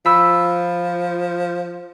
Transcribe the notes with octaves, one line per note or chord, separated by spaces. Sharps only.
F3 B5 E6 B6